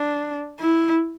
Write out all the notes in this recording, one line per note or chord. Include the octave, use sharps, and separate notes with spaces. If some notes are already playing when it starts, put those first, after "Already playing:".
Already playing: D4
E4